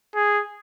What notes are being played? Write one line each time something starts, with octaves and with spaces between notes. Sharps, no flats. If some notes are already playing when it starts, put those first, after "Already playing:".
G#4